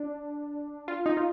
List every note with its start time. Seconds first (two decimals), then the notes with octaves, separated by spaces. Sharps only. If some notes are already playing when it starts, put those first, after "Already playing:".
Already playing: D4
0.88 F4
1.06 D#4
1.17 F4